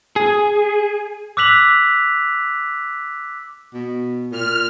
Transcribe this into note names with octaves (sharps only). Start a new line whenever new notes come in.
G#4
D6 E6 F#6 B6 F7 F#7
B2
A#2 F6